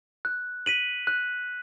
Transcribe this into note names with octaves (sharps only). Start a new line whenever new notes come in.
F#6
B6 D#7 F#7
F#6